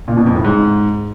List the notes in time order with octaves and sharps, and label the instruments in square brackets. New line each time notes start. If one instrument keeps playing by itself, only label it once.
[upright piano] A#2
B2
F2
A2
G#2